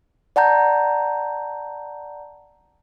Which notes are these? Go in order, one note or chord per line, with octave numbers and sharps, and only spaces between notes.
D5 F#5 A5 A#5 G6